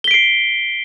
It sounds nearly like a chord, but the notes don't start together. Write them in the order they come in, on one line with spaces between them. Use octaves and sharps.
G7 B6 D7 C7